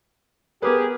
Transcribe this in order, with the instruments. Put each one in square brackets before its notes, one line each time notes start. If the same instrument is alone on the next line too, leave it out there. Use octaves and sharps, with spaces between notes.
[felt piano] B3 A#4 B4 [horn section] G4 G#4